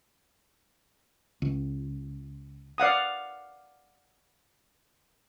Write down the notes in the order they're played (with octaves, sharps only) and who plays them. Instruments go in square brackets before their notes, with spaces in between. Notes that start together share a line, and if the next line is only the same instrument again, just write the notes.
[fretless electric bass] C#2
[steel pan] D5 F5 F#5 D#6